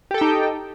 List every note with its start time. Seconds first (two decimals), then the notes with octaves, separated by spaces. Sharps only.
0.11 G4
0.14 A4
0.18 G5
0.21 D#4